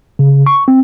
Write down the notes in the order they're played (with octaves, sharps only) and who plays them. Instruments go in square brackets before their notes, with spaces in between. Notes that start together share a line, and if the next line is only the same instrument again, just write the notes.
[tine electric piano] C#3
C#6
C4